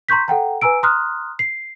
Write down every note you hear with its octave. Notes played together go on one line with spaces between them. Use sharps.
A#5 C6 C#6 G6 B6
A4 F#5 G5 A#5
B4 G#5 A#5 E6 D7
A#5 C6 D#6 F6 F#6
C7